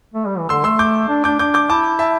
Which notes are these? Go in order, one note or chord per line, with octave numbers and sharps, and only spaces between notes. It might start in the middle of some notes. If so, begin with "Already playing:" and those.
A3
G3
E3
D3 C6 E6
A3 C6 E6
D6 G6
D4
D4 D6 G6
D4 D6 G6
D6 G6
E4 A5 D6
E5 A5